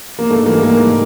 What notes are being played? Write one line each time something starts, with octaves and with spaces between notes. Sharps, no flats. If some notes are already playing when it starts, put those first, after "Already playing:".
A#3
G#2 A3
E3 G3 A#3
G#2 A#3
E3 G3